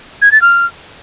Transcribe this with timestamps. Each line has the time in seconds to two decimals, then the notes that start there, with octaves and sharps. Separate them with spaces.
0.22 G#6
0.32 A6
0.42 F6